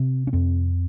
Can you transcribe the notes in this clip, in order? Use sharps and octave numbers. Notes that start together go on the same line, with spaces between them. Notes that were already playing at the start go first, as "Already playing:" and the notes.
Already playing: C3 C4
C#4
F2 C4